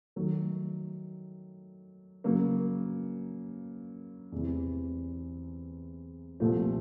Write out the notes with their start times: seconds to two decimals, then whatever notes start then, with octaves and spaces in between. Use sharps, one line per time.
0.16 D#3 F#3 A3
2.24 C#3 F#3 A#3
4.32 E2 C3 E3
6.40 C2 A#2 F3 A3